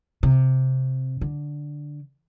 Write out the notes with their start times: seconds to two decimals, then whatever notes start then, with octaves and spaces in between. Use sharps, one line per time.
0.23 C3
1.21 D3